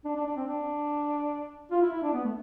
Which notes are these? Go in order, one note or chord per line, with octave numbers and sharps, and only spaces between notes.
D4
D4
D4
C4
D4
F4
E4
E4
D4
B3
A3